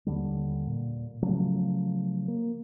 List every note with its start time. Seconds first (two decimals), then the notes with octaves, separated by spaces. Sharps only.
0.06 D#2 D3 G3
0.67 A#2
1.22 C#3 F3 F#3 A3
2.28 A#3